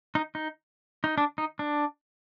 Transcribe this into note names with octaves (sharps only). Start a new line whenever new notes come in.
D#4
D#4
D#4
D4
D#4
D4